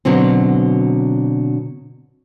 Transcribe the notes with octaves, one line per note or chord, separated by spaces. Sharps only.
B2 D3 F#3 C4